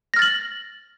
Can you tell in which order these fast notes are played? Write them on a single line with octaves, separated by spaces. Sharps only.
A#6 F6 A6 F#7